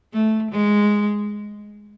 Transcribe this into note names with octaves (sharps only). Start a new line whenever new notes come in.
A3
G#3